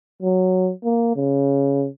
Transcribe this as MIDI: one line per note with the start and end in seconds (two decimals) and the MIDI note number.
0.23 0.71 54
0.84 1.14 58
1.16 1.86 49